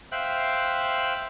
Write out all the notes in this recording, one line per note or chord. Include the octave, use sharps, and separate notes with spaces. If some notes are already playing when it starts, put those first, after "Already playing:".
C5 E5 F5 G5 F#6